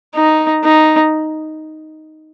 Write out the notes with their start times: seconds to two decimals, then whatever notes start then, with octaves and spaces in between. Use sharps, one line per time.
0.15 D#4
0.64 D#4